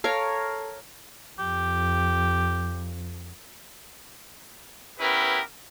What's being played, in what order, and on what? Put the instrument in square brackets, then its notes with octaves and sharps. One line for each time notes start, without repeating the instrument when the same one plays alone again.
[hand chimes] A4 A5 [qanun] A#4 C#5 F5
[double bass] F2 [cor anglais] G4
[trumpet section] B3 C#4 E4 G4 A#4 B4